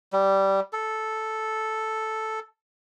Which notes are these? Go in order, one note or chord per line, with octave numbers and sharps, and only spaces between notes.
G3
A4